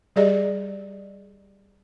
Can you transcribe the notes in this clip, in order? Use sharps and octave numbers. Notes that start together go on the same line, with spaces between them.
G3 G4 G#4 D5 D#5